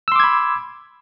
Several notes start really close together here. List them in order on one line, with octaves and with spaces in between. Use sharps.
E6 C6 D6 G#6 B5